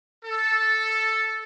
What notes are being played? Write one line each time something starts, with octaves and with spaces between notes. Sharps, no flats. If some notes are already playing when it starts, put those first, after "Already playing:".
A4